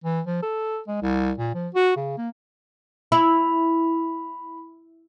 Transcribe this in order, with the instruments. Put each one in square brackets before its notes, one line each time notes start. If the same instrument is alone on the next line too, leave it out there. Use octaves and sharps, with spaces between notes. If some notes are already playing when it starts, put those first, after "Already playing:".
[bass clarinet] E3
F3
A4
G#3
C2
A#2
F3
F#4
C#3
A#3
[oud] E4 [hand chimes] B5